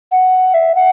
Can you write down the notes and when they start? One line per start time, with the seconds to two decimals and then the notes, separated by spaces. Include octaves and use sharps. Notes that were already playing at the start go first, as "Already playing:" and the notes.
0.11 F#5
0.54 E5
0.75 F#5